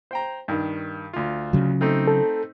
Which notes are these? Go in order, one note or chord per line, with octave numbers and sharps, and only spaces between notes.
C5 G5 A#5
G2 D#3
D2 F4
C#3 F#3
A3 C4 D#4
A4